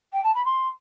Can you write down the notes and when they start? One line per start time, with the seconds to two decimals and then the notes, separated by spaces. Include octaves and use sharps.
0.13 G5
0.24 A5
0.34 B5
0.45 C6